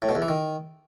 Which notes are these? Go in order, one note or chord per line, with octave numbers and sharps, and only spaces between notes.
A2
B2
E2
E3
D#3